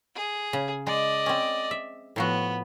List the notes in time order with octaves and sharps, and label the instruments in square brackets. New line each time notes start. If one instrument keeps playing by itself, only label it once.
[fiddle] G#4
[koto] C#3
[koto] G#3 [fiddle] D5 D#5
[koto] C4 C#4
E5
[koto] A2 F3 F#4 [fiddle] B3